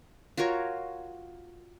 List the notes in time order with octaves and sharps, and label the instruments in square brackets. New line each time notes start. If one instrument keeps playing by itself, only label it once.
[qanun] F4 F#4 A#4 C#5